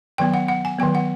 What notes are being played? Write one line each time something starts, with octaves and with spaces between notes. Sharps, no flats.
D#3 F#3 B3 G5
F#5
F#5
G#5
D#3 F#3 B3 G5
F#5